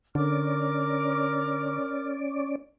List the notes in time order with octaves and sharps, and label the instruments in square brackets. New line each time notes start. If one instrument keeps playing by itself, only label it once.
[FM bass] D3 [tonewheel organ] C#4 D5 [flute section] A#4 D6 F6